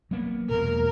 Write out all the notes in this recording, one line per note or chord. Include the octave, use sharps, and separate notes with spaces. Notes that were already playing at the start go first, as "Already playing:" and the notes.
F#3 A#3 B3
E1 B2 A#3 A#4